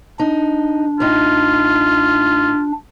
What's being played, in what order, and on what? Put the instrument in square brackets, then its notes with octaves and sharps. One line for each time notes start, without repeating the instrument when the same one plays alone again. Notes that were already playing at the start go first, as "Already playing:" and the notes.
[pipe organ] D4 [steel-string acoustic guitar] D#4
[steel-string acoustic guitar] A2 D#4 [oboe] F4